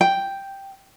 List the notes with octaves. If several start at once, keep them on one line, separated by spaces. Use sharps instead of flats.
G5